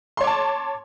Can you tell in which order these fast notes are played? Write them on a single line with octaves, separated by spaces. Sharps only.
C6 C#5 D6 A5